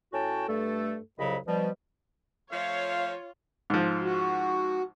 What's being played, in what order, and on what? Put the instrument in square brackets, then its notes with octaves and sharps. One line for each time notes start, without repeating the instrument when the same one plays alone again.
[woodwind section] A2 C#4 F#4 G5 A5
G2 A3 A4
C2 F2 C#3 F#3 D#5 B5
B2 F3 G3
[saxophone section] F3 A3 [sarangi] F4 [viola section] C#5 [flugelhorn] F5
[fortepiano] G#2 F3
[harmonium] F#4